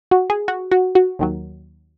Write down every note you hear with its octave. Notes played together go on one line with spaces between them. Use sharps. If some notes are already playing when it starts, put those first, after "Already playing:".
F#4
G#4
F#4
F#4
F#4
D#2 D#3 F#3